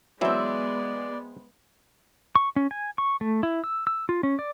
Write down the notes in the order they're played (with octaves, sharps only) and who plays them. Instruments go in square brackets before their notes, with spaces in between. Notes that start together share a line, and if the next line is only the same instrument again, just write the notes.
[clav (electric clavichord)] E3 F#3 E4 [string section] G#3 B3 [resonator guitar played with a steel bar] C4 E5 [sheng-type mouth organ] D5
[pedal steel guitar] C#6
C#4
G#5
C#6
A3
E4
E6
E6
F4
C#4
D5